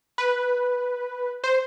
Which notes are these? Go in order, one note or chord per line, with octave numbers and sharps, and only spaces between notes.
B4
C5